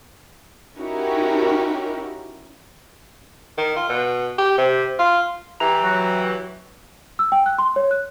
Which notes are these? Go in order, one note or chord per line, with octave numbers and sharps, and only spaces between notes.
C#4 D#4 E4 F#4 G4 A#4
D#3
F4
B2
G4
C3
F4
E3 G4 A#5
F#3 F#4
E6
G5
F#6
C6
C#5
F#6